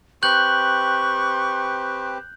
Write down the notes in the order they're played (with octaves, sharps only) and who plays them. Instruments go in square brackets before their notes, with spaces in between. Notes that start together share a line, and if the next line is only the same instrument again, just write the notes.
[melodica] C4 G4 B4 [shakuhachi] C#6 [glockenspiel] F#6 G6 F#7